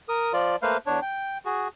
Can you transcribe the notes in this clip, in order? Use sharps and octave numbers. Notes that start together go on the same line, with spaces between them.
A#4 D#6
F3 F4 D5
A3 A#3 B4 C5 F5
E2 D4 C#5
G5
F#4 G#4